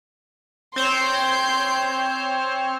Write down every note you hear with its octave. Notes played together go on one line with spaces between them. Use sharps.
C4 C5 C#5 C6 G6